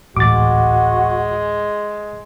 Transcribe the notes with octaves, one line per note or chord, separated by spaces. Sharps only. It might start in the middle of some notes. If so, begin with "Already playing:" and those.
D1 A1 G#2 G#3 F#4 D6 A6